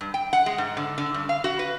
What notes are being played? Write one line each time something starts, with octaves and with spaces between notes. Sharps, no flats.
G2
G5
F#5
G#3
G#2
D3
D3
G2
F5
F#4
B4